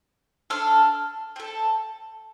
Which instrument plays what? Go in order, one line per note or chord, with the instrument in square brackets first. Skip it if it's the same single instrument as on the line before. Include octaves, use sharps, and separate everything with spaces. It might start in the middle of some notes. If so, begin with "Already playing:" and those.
[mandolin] D4 A4 F6
C4 A4